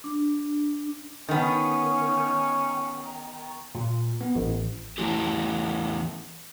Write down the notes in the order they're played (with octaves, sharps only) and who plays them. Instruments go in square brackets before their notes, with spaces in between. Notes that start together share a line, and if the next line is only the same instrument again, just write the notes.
[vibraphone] D4
[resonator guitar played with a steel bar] D#3 B3 [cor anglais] C#4
[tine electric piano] A#2
B3
A1
[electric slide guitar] E2 E3 A3 E4 G4